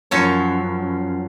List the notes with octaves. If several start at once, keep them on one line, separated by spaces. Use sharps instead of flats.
F#2 F3 C#5